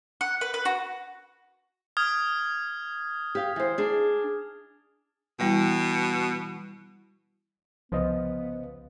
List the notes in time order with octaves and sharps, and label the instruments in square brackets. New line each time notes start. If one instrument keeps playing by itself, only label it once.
[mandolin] F#5
B4
B4
F#4
[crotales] D#6 F6 G#6
[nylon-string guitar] G4 F5
E3 C5
D4 G#4
[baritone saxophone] B2 [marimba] E3 G3 E4
[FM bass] C2 [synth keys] C#3 F3 [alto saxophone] B3 [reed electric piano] B4 C5 D#5